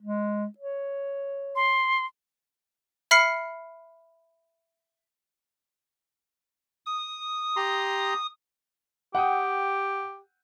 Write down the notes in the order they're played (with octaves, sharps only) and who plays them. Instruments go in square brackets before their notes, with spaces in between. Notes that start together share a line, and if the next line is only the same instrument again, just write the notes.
[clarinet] G#3
C#5
[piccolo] C6
[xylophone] E5 B5 F6 C7 C#7
[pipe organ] D#6
[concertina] G4 A#5 C6
[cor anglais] G4 [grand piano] F#5 G5 D#6